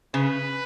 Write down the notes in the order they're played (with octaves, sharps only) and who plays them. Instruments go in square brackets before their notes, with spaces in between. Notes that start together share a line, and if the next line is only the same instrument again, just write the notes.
[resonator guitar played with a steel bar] C#3 [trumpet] B4